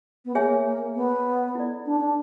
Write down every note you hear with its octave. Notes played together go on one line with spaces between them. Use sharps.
B3
A#3 G#4 C#5 E5 G#5
A#3
B3
E4 A4 D5
D4
D4